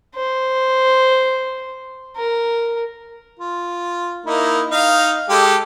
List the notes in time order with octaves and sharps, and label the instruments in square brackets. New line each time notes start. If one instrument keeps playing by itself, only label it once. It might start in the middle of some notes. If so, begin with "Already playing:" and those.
[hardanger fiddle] C5
A#4
[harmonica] F4
A#3 D#4 E4
D#4 F5
G#3 G4 A4